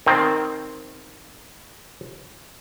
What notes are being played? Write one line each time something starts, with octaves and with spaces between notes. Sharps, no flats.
D#3 C4